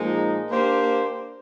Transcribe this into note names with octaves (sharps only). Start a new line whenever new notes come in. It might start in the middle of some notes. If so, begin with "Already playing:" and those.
Already playing: A#2 F3 G#3 D#4
A#3 D4 G4 C5